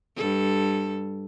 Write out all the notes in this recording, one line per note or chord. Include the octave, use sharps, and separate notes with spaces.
G2 A4